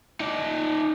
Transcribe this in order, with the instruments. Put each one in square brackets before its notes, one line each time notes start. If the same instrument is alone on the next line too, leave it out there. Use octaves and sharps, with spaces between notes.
[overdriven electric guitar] D#4 D5